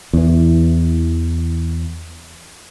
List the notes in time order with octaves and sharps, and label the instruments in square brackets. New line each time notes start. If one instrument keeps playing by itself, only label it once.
[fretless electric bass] E2 E3